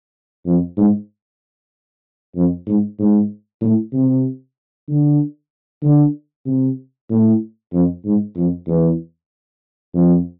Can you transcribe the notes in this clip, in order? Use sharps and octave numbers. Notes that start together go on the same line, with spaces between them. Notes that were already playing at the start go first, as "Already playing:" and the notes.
F2
G#2
F2
G#2
G#2
A2
C3
D3
D3
C3
A2
F2
G#2
F2
E2
F2